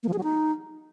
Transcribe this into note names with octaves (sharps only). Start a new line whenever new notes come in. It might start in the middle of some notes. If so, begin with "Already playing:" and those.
A#3
F3
G#4
F#3
D#4